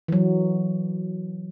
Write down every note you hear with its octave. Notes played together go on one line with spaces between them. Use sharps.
E3 F#3